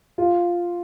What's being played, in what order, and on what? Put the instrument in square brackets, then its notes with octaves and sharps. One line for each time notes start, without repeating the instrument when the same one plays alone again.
[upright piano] F4